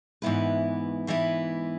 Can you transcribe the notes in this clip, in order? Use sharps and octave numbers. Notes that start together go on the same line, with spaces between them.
G#2 E3 B3 E4 B4
G#2 E3 B3 E4 B4